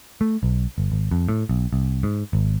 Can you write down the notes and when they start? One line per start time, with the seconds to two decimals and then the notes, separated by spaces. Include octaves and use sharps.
0.21 A3
0.43 B1
0.78 G1
0.92 G#1
1.11 F2
1.29 A2
1.49 B1
1.73 C2
2.03 G#2
2.33 G#1